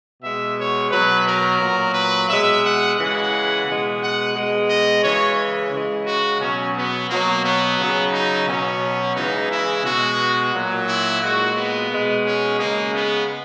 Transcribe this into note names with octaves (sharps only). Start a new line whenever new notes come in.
B2 G#3 E5
C#5
B2 F#3 B4
A#4
A#2 F#3
B4
B2 G#3 E5
F#5
C#3 E3 G#3 F#5
B2 G#3
F#5
B2 G#3
D#5
C#3 E3 G#3 C#5
C#3 G#3
F#4
B2 F#3 C#4
B3
B2 F#3 A#3
B3
C#3 F#3
D#4
B2 F#3 C#4
C#3 E3 G#3 D#4
E4
B2 G#3 F#4
A#2 F#3
E4
A#2 G#3 F#4
B3
B2 G#3
C#4
C#3 G#3 A#3
B3